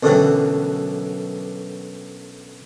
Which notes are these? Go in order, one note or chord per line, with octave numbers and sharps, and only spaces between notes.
B1 F#2 D3 E3 F#3 G3